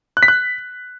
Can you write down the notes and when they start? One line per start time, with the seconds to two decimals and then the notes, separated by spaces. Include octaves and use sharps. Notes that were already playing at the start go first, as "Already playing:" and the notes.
0.17 F#6
0.23 B6
0.28 F#6